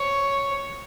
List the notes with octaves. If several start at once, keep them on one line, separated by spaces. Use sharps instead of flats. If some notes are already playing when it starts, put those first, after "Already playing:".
Already playing: C#5